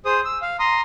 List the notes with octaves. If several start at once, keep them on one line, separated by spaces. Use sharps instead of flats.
G#4 C5 D#6
E6
F5
A#5 C6 D#6